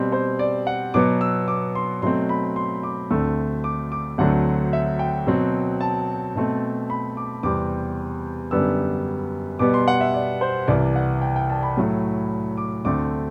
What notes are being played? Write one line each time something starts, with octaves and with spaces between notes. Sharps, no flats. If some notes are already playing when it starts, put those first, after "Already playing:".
Already playing: B2 G3 C4 C5
C5
D5
F#5
B2 F#3 B3 D6
E6
D6
C6
B2 F#3 A3 C4 C6
B5
C6
D6
D2 D3 A3 C4 E6
D6
D6
D2 D3 F#3 A3 C4 F#5
E5
G5
B2 F#3 C4
A5
B2 A3 C4
B5
D6
E2 C3 G3 C4 D6
F#2 D3 G3 B3 E6
B2 G3 B3 D6
C6
F#5
E5
D5
C5
C2 C3 E3 D5
F#5
G5
G5
A5
B5
A2 F#3 A3
D6
D2 D3 A3 C4 D6